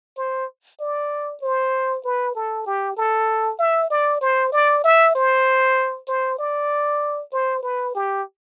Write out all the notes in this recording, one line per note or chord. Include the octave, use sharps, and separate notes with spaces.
C5
D5
C5
B4
A4
G4
A4
E5
D5
C5
D5
E5
C5
C5
D5
C5
B4
G4